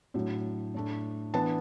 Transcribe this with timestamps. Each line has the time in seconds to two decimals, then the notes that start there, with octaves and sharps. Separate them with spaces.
0.14 A2 F#3 D4
0.74 A2 A3 D4
1.34 E3 B3 D4 A5